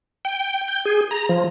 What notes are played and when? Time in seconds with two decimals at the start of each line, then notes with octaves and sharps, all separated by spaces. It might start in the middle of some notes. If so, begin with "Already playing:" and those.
0.25 G5
0.68 G6
0.85 G#4
1.11 A#5
1.29 F3